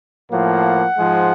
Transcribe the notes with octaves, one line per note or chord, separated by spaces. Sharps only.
A2 F3 A#3 F#5
G#2 F3 G#3